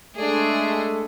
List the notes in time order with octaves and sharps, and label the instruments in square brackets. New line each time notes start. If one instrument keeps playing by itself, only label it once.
[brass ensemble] G#3 A3 [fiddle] D4 G#4